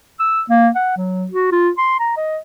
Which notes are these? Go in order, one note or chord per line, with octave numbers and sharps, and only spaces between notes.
E6
A#3
F#5
F#3
F#4
F4
C6
A#5
D#5